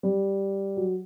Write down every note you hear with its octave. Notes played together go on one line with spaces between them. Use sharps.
G3
F#3